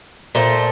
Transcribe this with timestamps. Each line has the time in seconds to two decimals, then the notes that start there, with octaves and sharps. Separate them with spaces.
0.35 A#2 A3 C5